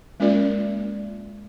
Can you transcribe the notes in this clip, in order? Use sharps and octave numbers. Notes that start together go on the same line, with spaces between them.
G#3 A#3 C#4 F4 A#4 D5